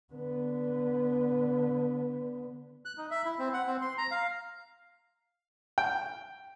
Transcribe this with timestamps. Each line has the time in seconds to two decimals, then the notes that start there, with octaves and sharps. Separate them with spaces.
0.14 D3 B3
2.85 F#6
2.98 D#4
3.11 E5
3.25 E4
3.39 C4
3.54 F#5
3.67 C4
3.82 C6
3.98 A#5
4.11 F5
5.78 G5